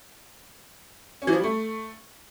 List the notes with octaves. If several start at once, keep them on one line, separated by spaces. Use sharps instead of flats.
C#4
E3
F3
G3
A3